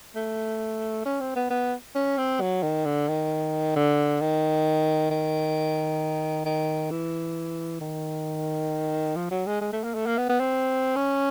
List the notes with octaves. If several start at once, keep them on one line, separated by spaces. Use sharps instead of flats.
A3
C#4
C4
B3
B3
C#4
C4
F#3
D#3
D3
D#3
D3
D#3
D#3
D#3
E3
D#3
F3
F#3
G#3
G#3
A3
A#3
A3
A#3
B3
B3
C4
C#4